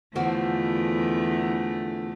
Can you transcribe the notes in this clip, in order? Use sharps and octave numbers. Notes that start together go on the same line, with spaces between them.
E2 D3 F3 A3 F#4